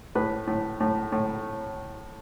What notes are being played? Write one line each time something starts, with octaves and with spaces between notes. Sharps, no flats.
A2 B4
A2
A2
A2